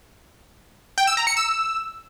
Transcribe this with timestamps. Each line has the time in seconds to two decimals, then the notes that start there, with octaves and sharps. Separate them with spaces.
0.98 G5
1.07 E6
1.17 A#5
1.27 C#7
1.37 E6